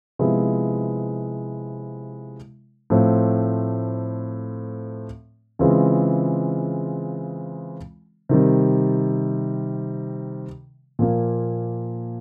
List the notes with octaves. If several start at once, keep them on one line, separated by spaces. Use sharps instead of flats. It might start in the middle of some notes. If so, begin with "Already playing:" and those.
C3 F3 G#3 B3 E4
A2 F3 A3 C4
C#3 E3 G#3 C4 F4
C3 D#3 G3
A#2 F3 A#3